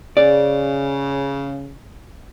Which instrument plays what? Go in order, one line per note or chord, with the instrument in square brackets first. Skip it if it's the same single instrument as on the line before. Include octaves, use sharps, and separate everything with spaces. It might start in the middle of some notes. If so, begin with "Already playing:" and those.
[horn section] C#3 [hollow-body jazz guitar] D5